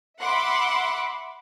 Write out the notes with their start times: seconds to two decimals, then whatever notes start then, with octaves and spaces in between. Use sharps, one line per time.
0.19 E5 F#5 B5 C6 D6